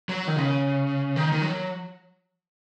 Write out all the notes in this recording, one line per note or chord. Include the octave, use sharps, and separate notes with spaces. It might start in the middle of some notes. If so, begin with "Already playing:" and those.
F#3
D#3
C#3
D#3
D#3
F#3